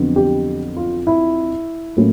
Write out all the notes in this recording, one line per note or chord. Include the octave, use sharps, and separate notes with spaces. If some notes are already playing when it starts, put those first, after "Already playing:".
Already playing: F2 D3 F#3 B3
G4
F4
E4
A2 F#3 A#3 C#4